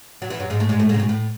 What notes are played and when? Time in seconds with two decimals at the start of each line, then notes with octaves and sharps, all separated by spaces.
0.22 F#3
0.30 E2 E3
0.40 F#2 F#3
0.50 G#2 G#3
0.60 A2 A3
0.69 G#2 G#3
0.79 A2 A3
0.89 G#2 G#3
0.94 C#3
1.00 B2
1.09 A2